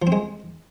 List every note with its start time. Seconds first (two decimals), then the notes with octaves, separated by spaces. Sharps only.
0.02 F3
0.07 C4
0.12 G#3